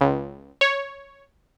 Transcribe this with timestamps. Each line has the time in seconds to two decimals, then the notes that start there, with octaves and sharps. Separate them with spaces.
0.01 C#2
0.61 C#5